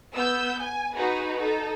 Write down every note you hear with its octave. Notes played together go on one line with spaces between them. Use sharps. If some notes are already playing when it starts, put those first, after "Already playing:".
B3 E6 G6
G#5
D#4 F#4 G#4 B4
D#4 A4